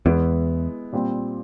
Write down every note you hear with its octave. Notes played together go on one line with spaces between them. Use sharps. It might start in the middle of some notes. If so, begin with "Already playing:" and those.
E2 G#3 B3 E4
A#2 G3 C4